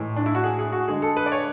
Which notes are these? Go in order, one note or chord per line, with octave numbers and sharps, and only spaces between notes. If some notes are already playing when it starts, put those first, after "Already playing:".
Already playing: A2 E3 G#3
D4
E4
F#4
G#4
G#4
F#4
D3 G#3 G#4
A4
B4
D5
C#5